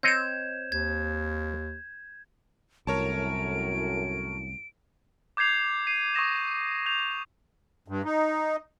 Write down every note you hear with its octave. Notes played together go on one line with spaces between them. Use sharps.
C4 C#5 D#5 G6 G#6 E7
D#2 G#6
C2 F#2 A2 A#4 C#5 A5 D7
D6 G6 G#6 C7 F7
C7 D#7
C#6 D#6 A#6 E7
G6 A#6 F7
G2
D#4